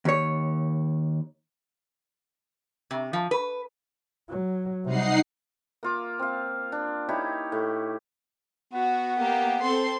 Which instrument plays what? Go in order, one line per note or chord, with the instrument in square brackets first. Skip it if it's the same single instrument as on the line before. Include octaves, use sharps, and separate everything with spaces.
[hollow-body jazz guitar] D#2 C#5
[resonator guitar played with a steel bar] C3
F3
B4
[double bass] F#3
[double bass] C3 G3 [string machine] D#4 F#5 C7
[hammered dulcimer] A#3 F4 D6
C4 F5
D4
D#4 E4 G4 C#5
A2
[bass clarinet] B3 [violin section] F#4
[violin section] A#3 G4
C4 A4 C6